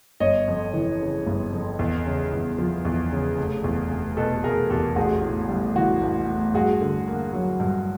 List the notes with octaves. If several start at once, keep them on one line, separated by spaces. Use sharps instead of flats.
G1 C#5 D#5
F2
E3
C#3
G1
F2
E2
C#3
E2
F3
E2
C#3
F1
E2
F1
B2 A4 B4
F1 G#4 A#4
E2 G4 A4
A1 F#4 G#4
A2
G3
E3 F#4
A1
A2
G2 F#4 G#4
D3
A#3
F#3
G2